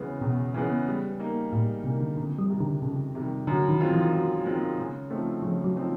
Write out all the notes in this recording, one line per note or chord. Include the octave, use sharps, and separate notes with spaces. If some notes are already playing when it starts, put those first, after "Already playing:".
Already playing: E2 C#3 E3 G#3 B3
E2 B2
C#3 E3 G#3 B3
G3
A#3 D#4
A2 G3
C3 A#3 D#4
D3
F2 D3
G3
C3 D#3 G3
D3
F2 C#3
C3 D#3 G3
F#2 D3
D#3
D#3 G#3 C4 F4
E3
F#2
D#3 G#3 C4 F4
C#3
F3 A3 C4 D#4
C#3 F3
F#3
F3 A3 C4 D#4